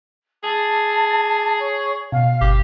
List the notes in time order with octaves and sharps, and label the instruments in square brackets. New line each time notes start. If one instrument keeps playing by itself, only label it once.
[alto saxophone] G#4 [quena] A5
[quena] C#5
[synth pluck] B2 [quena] F5
[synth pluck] G1 [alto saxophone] G4